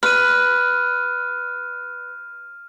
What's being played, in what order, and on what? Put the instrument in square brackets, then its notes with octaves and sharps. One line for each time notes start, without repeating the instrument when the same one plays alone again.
[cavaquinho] B4 [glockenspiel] F6 D#7